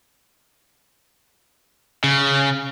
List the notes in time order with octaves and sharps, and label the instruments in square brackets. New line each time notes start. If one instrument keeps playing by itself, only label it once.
[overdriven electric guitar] C#3